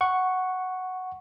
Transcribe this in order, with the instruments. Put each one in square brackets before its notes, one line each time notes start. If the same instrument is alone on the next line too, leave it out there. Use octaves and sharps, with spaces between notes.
[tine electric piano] F#5 C#6